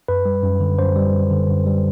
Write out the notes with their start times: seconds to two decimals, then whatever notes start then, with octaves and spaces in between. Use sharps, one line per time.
0.08 F#2 B4
0.26 G3
0.43 F#2
0.60 D3
0.78 F#2 C5
0.96 G3
1.13 F#2
1.31 D3
1.49 F#2
1.66 G3